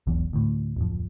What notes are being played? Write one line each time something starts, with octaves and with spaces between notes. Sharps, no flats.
E1 B1 E2
D2 A2
D1 F2